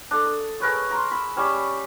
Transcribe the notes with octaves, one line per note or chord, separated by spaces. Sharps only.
D4 A4
D#6
G#4 A#4 B4 C#5
A#5 C6
B5 E6
G3 C#4 E6